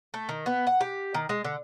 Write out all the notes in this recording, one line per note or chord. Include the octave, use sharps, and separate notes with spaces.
A3
D#3
B3
F#5
G4
D#3
G#3
D3